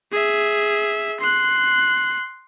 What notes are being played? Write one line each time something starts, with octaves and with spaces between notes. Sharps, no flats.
G#4 E5
C6 F#6